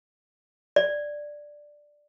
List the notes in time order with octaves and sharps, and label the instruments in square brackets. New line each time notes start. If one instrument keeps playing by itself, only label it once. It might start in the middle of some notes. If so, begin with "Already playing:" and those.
[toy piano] D5